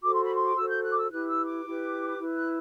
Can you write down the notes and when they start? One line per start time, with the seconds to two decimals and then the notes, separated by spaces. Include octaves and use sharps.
0.02 F#4 A4 C5 D6
0.13 C6
0.23 B5
0.35 C6
0.47 D6
0.56 F#4 A4 C5 E6
0.70 G6
0.83 F#6
0.90 D6
0.97 E6
1.10 E4 G4 B4 F#6
1.28 E6
1.47 D6
1.64 E4 G4 B4
2.18 E4 B4
2.36 F#6